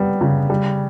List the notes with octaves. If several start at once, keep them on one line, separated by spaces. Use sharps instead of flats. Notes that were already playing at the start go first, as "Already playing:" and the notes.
Already playing: G3 B3
C#3
G3